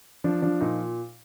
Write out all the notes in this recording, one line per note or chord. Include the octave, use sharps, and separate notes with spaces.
F3 D4
F3 D4
A#2 D#4